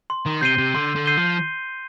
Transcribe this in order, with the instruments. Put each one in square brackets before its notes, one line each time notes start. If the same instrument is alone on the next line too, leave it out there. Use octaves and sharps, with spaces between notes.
[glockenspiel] C6
[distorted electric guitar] D#3
[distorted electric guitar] C3 [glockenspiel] G6 C7 D#7 G7
[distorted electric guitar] C3
[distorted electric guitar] D3 [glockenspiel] C6
[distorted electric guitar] D3
[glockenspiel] G6 C7 D#7 G7
[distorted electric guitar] F3